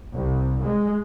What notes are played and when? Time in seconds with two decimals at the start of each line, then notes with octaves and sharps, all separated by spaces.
0.14 C2
0.64 G#3